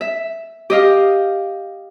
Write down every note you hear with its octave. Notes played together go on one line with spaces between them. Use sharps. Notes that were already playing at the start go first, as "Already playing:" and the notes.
E5
G4 D#5 F5